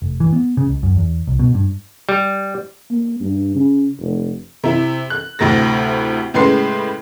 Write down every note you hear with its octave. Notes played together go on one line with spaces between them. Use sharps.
F1
E3
B3
C#3
C#2
F#2
E2
C2
B2
G2
G3
A#3
G2
C#3
F1
C3 E4
F#6
D2 A2 C3 A6 A#6
A2 C#3 G#3 B4 C6 C7